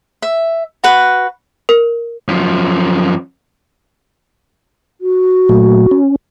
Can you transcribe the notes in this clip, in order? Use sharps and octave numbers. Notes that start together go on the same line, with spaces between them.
E5
F#4 B4
A#4
F#2 F3
F#4
A#2 F#3 A3
C#4